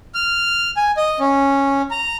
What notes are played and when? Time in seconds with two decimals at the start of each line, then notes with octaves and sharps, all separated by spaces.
0.15 F6
0.77 G#5
0.97 D#5
1.20 C#4
1.91 A#5